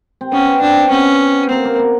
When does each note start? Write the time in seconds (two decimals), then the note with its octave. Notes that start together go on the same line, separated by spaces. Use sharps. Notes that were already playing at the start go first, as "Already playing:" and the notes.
0.21 C4
0.32 B3 C#4
0.46 C4
0.61 C4 D4
0.90 B3 C#4
1.49 A#3 C4
1.65 A#3
1.79 B3